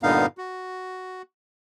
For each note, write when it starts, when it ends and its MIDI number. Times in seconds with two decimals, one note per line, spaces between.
0.03 0.26 43
0.03 0.26 46
0.03 0.26 50
0.03 0.26 59
0.03 0.26 63
0.03 0.26 77
0.38 1.22 66